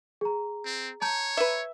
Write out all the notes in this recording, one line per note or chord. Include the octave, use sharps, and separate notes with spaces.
G#4 A#5
C4
C#5 A5 A#5 G6
B4 E5